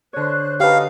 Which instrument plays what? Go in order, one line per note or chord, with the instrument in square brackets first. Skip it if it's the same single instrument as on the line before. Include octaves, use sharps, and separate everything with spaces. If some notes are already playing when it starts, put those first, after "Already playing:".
[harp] D3 C#5 [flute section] C5 F#6
[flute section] D#4 F#4 [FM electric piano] G4 B4 [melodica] F5 [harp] F#5 A5